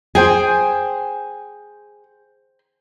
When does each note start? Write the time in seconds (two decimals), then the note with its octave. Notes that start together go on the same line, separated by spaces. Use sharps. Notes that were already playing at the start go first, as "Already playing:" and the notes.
0.15 G#4 C5 G5 G#5